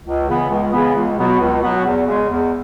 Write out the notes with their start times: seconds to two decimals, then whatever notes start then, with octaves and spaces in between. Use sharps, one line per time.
0.05 C#2
0.28 C#3 E3 B3
0.50 C#2
0.73 C#3 E3 B3
0.95 C#2
1.17 B2 F#3 B3 F#4
1.40 C#2
1.63 B2 F#3 B3 F#4
1.85 E2
2.06 C#3 G#3
2.30 E2